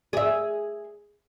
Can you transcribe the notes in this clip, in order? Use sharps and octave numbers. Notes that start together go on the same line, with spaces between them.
G#4 E5